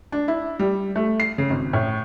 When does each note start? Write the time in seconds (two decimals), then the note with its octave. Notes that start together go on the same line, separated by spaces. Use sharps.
0.12 D4
0.28 E4
0.59 G3
0.96 A3
1.20 C7
1.38 C#3
1.50 G#1
1.73 A2